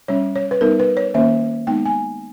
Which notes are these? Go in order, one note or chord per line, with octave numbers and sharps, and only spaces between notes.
G3 C#4 C#5
C#5
B4
G3 B3 D#4 A#4
B4
C#5
D#3 A#3 C#4 E5
G#3 B3 D#4 G5
G#5